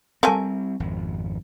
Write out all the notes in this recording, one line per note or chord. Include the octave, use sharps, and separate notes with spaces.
G3 A3 C4 A#4 G#5
G#1 F2